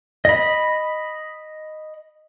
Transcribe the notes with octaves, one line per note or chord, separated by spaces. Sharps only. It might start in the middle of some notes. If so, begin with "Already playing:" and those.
D#5 B5